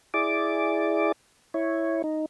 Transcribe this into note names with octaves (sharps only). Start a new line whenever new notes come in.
E4 G#4 D5 D6
E4 C#5
D#4